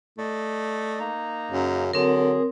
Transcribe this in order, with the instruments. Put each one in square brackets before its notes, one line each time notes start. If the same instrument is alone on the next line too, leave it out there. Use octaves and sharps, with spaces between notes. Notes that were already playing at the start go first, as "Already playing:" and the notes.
[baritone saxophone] A3 [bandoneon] D5 D#5
[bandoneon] A#3 D#4 A#5
[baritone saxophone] F#2 [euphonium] C#3
[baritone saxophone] D3 [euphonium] F#3 [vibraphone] C4 A#4 [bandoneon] G#4